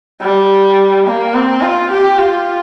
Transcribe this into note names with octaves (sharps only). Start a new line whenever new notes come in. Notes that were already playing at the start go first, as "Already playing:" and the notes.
G3
A#3
C4
F4
G4
F4